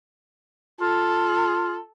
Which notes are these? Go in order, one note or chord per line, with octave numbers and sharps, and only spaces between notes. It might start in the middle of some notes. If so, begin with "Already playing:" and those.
F4 A4